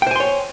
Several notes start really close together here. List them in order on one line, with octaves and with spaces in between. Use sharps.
G5 C5 G#5 C6 C#5